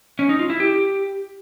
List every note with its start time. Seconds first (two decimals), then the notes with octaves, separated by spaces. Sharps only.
0.19 C#4
0.29 D#4
0.39 F4
0.50 E4
0.60 G4